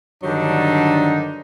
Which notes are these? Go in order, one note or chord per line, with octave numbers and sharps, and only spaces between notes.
G2 D3 D#3 F#3 D4 D#4